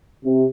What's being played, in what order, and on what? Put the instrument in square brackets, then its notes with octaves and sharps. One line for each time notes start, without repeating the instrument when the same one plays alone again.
[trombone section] C3